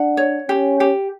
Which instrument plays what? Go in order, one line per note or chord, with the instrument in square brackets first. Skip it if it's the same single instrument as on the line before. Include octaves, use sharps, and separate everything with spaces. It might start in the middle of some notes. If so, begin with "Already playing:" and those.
Already playing: [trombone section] D4 [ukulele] F#5
[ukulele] C#5
[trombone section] C#4 [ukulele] G4
[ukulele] G4